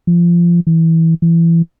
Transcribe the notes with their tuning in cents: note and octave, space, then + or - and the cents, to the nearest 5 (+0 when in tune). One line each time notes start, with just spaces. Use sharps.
F3 -20
E3 -15
E3 +20